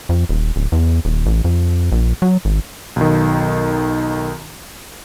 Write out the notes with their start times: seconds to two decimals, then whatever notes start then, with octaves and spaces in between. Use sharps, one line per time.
0.09 F2
0.29 D#1
0.56 D1
0.72 E2
1.05 D#1
1.26 A1
1.44 F2
1.92 A#1
2.22 F#3
2.45 G#1
2.96 B1 D#3